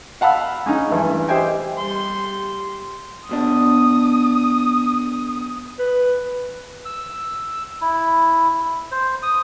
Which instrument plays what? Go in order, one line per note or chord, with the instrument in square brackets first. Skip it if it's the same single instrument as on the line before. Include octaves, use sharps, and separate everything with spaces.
[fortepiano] F5 F#5 A5 B5 E6 F#6
G#3 C#4 D#4
G2 E3 A3
G4 C5 D#5 E5 G5 G#5
[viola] G3 C6
[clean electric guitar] B1 B2 D4 [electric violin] D#6
[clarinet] B4
[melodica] E6
E4
C5
D#6